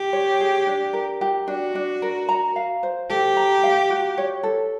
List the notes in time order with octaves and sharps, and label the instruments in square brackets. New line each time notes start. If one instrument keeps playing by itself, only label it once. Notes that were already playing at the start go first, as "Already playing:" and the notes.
Already playing: [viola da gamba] G4
[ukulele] C#5
G#4
D4
A#4
G4
[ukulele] D4 [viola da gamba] F#4
[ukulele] D4
A#4
A#5
F5
C5
[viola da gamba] G4 [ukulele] A4
[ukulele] A#5
F5
F#4
C#5
A4